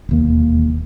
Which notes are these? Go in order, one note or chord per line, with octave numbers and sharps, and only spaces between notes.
E1 D#2 A#3